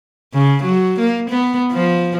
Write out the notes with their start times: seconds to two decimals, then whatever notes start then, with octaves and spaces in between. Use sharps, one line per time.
0.33 C#3
0.63 F#3
0.99 A#3
1.30 B3
1.72 F3